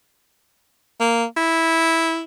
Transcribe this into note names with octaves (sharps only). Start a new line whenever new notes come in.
A#3
E4